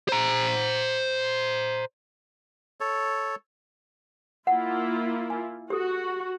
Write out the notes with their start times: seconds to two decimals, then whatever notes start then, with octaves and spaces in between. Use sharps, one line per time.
0.09 C5 A#5
2.80 A4 C#5
4.47 A#3 E4 F4 F#5
5.30 G#5
5.70 F#4 G4 A4